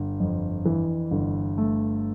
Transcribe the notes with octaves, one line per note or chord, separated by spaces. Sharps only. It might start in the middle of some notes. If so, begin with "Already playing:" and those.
Already playing: G1
F2
E3
G1
A3